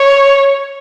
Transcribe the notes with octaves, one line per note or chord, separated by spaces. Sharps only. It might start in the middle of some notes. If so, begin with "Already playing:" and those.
Already playing: C#5